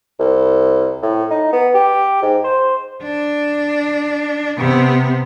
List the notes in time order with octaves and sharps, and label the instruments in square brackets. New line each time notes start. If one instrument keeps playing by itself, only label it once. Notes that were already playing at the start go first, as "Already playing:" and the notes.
[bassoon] C2
A2
D#4
B3
G4
G#2
C5
[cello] D4
C3 B3